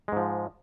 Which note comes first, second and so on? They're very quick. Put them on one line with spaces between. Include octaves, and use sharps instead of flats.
G#3 G#2 F3